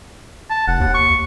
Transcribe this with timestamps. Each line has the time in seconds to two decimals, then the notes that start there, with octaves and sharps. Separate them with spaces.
0.50 A5
0.68 F1 F#5
0.81 D#2
0.94 C#6